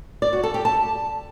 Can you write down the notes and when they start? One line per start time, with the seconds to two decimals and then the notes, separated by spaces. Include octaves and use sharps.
0.22 D5
0.33 F#4
0.43 A4
0.54 G4
0.65 A5